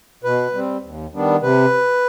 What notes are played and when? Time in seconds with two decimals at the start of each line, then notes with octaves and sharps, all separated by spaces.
0.23 B2 B4
0.54 G3 C4
0.82 D#2
1.13 D#3 G3 B3 D4
1.42 C3 B4